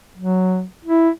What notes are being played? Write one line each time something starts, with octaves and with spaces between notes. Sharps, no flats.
F#3
E4